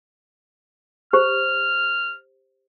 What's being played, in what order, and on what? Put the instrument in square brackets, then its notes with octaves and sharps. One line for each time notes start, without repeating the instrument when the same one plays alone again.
[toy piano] G4 C5 [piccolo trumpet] F6